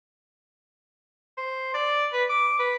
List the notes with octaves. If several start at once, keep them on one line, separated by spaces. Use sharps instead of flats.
C5
D5
B4
D6
B4